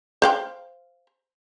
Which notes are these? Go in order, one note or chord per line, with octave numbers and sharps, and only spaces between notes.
C5 F5 G5